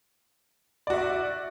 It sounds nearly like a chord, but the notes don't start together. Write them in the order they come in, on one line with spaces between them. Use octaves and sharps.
D5 F#4 E5